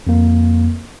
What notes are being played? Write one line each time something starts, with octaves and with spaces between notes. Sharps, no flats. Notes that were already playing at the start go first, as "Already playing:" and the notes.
F2 A#3